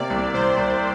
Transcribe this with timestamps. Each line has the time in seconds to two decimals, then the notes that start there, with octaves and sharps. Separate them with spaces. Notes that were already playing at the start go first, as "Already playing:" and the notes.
Already playing: C3 A#3 D5
0.10 C2
0.34 C2 C5
0.57 C2